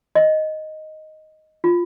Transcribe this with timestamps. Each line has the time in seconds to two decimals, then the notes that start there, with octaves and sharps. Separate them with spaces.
0.15 D#5
1.64 F4